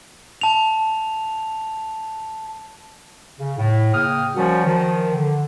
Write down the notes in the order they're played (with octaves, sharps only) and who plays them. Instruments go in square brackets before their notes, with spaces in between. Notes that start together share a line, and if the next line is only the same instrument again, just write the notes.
[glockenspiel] A5 F7
[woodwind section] C#3
A2
C#3 A#3 G5 D#6 F6
F3 G3 C#4 F#4 A#4 C#5
D#3 F3
D3